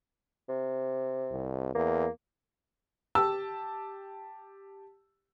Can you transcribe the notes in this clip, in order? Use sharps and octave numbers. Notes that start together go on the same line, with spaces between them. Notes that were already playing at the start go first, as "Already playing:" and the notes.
C3
C2
E2 A#3
G4 A5 E6